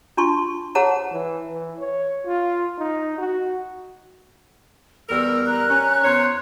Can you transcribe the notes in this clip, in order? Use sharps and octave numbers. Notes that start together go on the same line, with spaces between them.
D4 F4 A5 C6 C#6
G#4 C5 C#5 F#5 A5 A#5
E3
E3
C#5
F4
D#4
F#4
E2 G3 A#4 E6 F6
A#5 F#6
C#4
E2 C5 C#5